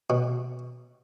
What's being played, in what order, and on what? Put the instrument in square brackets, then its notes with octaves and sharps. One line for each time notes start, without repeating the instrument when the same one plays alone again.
[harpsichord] B2